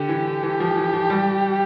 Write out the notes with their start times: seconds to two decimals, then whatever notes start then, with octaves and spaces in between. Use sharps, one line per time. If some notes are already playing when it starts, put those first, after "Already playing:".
Already playing: D3 G4
0.09 E3
0.43 E3
0.60 F3
0.77 E3
0.93 F3
1.10 G3